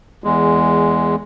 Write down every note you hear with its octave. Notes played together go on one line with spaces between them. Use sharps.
E2 G#3